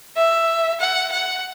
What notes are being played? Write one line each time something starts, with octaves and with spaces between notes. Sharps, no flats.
E5
F#5
F#5